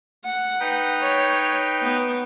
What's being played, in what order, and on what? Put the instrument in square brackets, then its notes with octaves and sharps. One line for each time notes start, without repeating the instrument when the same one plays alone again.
[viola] F#5
[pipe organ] D#4 B4 G5
[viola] C#5
B3